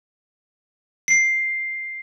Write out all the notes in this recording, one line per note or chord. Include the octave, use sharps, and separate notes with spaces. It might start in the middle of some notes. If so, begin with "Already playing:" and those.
C7